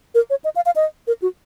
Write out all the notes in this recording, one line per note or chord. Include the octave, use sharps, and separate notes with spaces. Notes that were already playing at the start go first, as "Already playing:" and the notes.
A#4
C#5
D#5
F5
F5
D#5
A#4
F#4